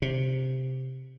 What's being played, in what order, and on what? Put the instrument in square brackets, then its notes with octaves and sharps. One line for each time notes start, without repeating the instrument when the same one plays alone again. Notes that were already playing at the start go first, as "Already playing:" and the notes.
[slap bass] C3